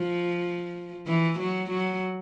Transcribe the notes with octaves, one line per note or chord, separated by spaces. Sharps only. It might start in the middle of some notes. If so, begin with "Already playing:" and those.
Already playing: F3
E3
F#3
F#3